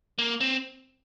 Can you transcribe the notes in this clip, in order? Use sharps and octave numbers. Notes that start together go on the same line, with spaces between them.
A#3
C4